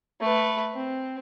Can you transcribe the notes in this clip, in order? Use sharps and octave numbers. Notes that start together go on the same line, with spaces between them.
A3 B4
C4